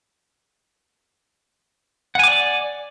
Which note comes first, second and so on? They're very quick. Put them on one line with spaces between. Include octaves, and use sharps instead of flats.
F#5 G#5 D6 D5